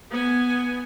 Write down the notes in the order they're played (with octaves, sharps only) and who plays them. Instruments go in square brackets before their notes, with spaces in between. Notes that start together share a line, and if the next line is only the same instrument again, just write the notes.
[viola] B3 G#5